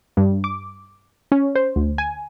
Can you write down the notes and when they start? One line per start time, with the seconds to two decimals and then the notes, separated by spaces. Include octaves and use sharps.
0.17 G2
0.44 D6
1.32 C#4
1.55 C5
1.76 D2
1.98 G#5